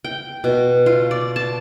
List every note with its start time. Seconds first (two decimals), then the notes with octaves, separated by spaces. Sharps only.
0.04 G5
0.44 B2
0.86 F4
1.11 D5
1.36 A5